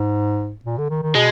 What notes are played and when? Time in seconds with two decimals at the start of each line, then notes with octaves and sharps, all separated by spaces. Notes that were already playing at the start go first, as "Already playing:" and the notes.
Already playing: G#2
0.65 A#2
0.78 D3
0.90 D#3
1.02 D#3
1.15 B2 G#3